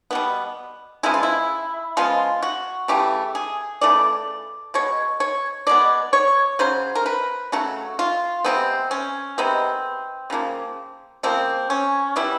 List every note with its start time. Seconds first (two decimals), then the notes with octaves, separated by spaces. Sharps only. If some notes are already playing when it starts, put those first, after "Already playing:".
0.11 B2 G3 B3
1.03 C#3 F3 G#3 B3 E4
1.14 F4
1.23 E4
1.97 C#3 F3 G#3 B3 F4
2.42 F#4
2.88 C#3 E3 A3 G4
3.35 G#4
3.81 C#3 E3 A3 D5
4.74 B2 G#3 C#5
5.20 C#5
5.67 B2 G#3 B3 D5
6.13 C#5
6.59 C#3 F#3 C5
6.95 A#4
7.06 B4
7.52 C#3 F#3 A3 F#4
7.99 F4
8.44 C3 D#3 G#3 B3 C4
8.91 C#4
9.38 C3 D#3 G#3 B3 C4
10.30 C#3 F3 A#3
11.23 C#3 F3 A#3 C4
11.70 C#4
12.16 B2 G3 B3 E4